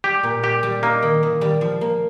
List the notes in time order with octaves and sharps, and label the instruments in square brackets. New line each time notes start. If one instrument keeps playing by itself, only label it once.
[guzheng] G3 [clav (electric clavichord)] G4
[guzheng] A#2
[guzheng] G3 [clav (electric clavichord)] G4
[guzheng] G3
[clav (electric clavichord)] A#3 [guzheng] D#4
[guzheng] D#3
D#3
G3
F3
A#3